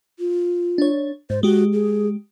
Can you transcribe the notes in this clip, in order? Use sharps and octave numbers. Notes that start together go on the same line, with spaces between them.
F4
D4 C#5
G#2 C5
G#3 F#4 G4
G#4